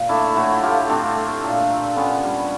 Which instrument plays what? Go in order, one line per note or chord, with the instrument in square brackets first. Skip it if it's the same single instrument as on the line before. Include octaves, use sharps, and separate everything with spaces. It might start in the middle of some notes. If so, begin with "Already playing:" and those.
Already playing: [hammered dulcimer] A#2
A3 D4 E4
A2 E4 F#4
A3 F4 G4
A2 C4 D4
A3
A#2
A#2
D3 B3 C#4
G3